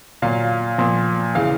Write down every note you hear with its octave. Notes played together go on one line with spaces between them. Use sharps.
A#2 F#3 F5
A#2 F3
C#3 E3 F5